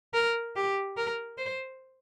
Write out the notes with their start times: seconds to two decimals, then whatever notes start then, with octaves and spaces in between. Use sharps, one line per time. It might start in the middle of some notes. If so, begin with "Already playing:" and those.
0.14 A#4
0.56 G4
0.97 A#4
1.38 C5